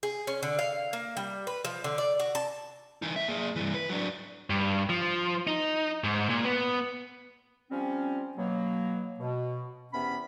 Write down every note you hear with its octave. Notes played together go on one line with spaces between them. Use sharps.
G#4
C#4
D3
F5
A#3
G3
B4
F3
D3
D5
F#4
A5
E3 D#4
A2 E5
A#3 G#4
G2 E3
B4
F#3 D4
G2
F3
D#4
G#2
A#2
B3
F3 G3 C4 C#4
B2 F#3 A#3
B2
E2 C3 B3 C#4 B5